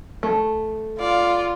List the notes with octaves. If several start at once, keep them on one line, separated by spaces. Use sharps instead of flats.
A3
F4 D5 F5